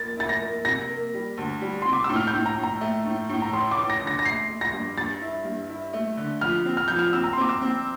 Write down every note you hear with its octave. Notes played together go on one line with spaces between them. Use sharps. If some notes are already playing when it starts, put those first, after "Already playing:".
Already playing: A#3 A6
E4 A6
A#6
A#3
C3 A#6
A#3
G3
D2
G3
C3 C6
D6
E6
A2
F6
G6
A2
A#5
A2
A#5
A3
A2
A2
A#5
A1 C6
D6
A1
A#6
D3
A#6
A#6
A3 C7
A3
A#6
G2
G2 A6
E4
G2
E4
A3
D3
F3 F6
C4
F6
F3 G6
F6
C4 E6
A#5
C6
C4 D6
E6
C4